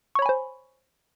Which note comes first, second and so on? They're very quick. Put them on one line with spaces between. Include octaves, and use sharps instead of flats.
C#6 C#5 B5 G#5 C5